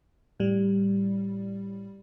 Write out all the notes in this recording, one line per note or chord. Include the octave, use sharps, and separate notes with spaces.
A2 G3